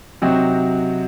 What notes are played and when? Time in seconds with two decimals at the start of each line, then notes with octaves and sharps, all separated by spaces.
0.22 C3 F#3 C4 D#4 F#4